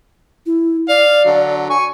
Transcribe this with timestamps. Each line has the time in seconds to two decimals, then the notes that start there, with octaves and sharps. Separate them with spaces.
0.46 E4
0.89 D5 F5
1.25 D3 F#3
1.70 G#5 C#6